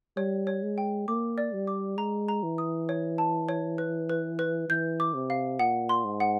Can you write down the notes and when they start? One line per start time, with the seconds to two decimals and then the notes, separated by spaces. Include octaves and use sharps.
0.17 G3 C#5
0.47 C#5
0.63 G#3
0.78 G5
1.08 A#3 D6
1.38 D5
1.53 G3
1.67 D6
1.97 G#3 A#5
2.28 A#5
2.43 E3
2.58 D#6
2.89 C#5
3.18 A5
3.49 C#5
3.78 B4
4.09 B4
4.39 B4
4.69 E3 G6
5.00 D6
5.14 C3
5.30 F5
5.59 A#2 F#5
5.89 C6
6.05 G#2
6.20 F#5